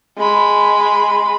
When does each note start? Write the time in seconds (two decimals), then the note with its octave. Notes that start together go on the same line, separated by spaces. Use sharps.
0.18 G#3 B5